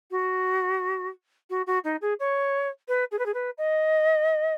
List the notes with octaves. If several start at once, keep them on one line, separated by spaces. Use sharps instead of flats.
F#4
F#4
F#4
D#4
G#4
C#5
B4
G#4
B4
G#4
B4
D#5